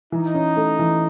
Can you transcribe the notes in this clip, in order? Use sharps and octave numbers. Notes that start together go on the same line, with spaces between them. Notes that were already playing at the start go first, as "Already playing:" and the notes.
E3 D#4
C#4
A3
E3